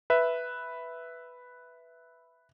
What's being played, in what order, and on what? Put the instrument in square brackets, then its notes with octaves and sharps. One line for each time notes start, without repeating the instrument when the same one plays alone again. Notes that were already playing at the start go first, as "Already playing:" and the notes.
[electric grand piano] B4 E5